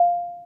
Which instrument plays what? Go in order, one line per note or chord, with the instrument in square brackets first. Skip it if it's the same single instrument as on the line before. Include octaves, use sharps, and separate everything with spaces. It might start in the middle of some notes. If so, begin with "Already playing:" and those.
Already playing: [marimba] F5